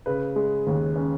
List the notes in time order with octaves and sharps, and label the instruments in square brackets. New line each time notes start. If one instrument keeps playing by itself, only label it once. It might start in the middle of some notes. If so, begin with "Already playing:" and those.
[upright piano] C#3 B4
G#3
D#2
C#4